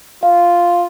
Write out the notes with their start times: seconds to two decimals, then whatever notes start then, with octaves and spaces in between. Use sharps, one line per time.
0.23 F4 F5